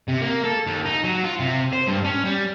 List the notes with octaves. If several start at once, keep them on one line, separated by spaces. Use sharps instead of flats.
C3
A#3
A4
D#2
D#4
F#3
F4
C3
C5
G2
C#4
G3